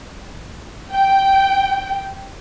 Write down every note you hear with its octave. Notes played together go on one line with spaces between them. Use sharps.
G5